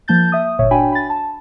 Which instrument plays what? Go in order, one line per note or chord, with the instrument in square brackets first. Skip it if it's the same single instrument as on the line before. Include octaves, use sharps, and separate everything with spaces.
[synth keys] F3 A#3 A5 G6 A6
E5 D#6
G1 A#2 C#5 E5
D4 F#4 G5 G#5 B5
B5 A6
A5